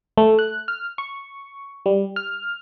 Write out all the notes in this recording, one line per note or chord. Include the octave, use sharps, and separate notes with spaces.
A3
F#6
F6
C#6
G3
F6